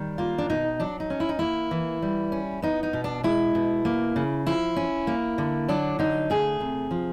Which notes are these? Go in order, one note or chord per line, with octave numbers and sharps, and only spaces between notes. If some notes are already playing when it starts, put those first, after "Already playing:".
Already playing: D#3 G3
A#3 F4
D4
B2 D#4
F#3 D4
D#4
C#4
E4
D#4
A#3 E4
E3
G3
C#4
B3 D#4
D#4
B2
D4
G#3 E4
B2
A#3
C#3
F3 E4
C#4
A#3
D3
F#3 D4
D3 D#4
A3 G#4
C3
F3